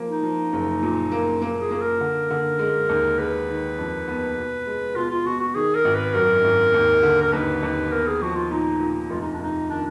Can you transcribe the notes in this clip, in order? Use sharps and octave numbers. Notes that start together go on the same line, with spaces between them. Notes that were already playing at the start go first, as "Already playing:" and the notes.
Already playing: F3 A#3
D#4
F3
F#1
A#2
A#3
A#3
G#4
A#3
A#4
D3
D3
G#3
D#2
G#3 B4
D#3
F2
B3
B2
G#3
B2 F4
F4
B2 F#4
F#4
D#3 G#4
A#4
G#1
B4
F#2 A#4
G#1
D#2
D3
A#4
D#2 B4
D#2
B3 A#4
G#4
F3 F#4
F4
A#2 D#4
A#2
F1 F4
D#4
D4
F1 D#4
D#3 D4